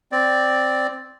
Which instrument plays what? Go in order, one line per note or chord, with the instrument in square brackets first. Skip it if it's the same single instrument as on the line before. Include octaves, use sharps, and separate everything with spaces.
[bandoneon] C4 D5